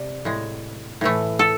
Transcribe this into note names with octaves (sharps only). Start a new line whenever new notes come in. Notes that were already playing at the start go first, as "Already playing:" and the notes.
Already playing: C3 D5
A2 G#3
A2 E3 A3
A4